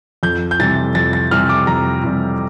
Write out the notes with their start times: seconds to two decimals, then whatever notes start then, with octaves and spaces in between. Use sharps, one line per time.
0.23 F2 G6
0.51 G6
0.59 C3 E3 G3 A6
0.95 F2 A6
1.13 A6
1.31 C3 E3 G3 F6
1.49 D6
1.67 F2 A#5
2.03 C3 E3 G3